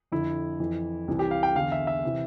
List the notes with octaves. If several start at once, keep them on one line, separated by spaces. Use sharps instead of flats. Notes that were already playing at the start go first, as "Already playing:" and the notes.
F2 D3 E4
F2 E3
C2 C3 E3
G4
F5
G5
E2 D3 F5
E5
E5
C3 E3